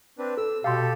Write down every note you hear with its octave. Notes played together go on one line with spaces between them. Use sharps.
C4 D4 B4
A4 E6
B2 G4 A4 F5 C6